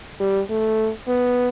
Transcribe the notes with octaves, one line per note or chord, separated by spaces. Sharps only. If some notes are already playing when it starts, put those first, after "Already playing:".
G3
A3
B3